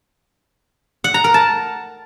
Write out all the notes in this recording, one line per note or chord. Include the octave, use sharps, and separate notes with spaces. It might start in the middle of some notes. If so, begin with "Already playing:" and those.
F#5
A#5
A#4
A5